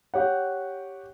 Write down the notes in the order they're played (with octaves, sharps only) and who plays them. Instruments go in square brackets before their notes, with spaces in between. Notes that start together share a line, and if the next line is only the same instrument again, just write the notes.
[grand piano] G4 C#5 F#5